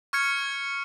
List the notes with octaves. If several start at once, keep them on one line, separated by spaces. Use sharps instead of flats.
C#6 F6 G#6 C#7